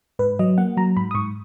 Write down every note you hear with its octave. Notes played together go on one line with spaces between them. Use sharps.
G#2 B4
F#3 D#5
A#3 F#5
F#3 A#5
G#2 B5
D#6
G#2 C#6